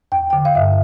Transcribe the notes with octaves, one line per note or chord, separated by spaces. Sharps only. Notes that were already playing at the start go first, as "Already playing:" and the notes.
E2 G5
D3 G5
F5
G2 E5